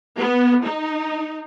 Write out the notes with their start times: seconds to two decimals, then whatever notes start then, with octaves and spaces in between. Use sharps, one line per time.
0.19 B3
0.64 D#4